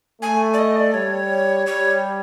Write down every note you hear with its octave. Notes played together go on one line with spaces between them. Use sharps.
A3 G#5
D5
D#5
D5
G3 C#5
G3 C#5